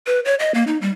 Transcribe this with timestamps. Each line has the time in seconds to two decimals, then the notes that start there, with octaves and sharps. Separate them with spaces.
0.07 B4
0.25 C#5
0.39 D#5
0.54 A#3
0.67 D#4
0.82 G3